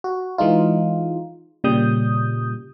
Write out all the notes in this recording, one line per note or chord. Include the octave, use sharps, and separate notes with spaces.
F#4
E3 G#3 D#4 F4
A#2 C#3 G3 D#6 G6